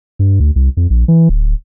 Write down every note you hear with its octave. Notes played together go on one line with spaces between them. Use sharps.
G2
D2
C2
F2
A#1
E3
D1